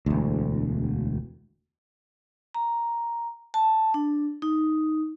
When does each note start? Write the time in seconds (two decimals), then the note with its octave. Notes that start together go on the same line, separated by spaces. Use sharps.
0.06 E1 D2
2.54 A#5
3.54 A5
3.94 D4
4.42 D#4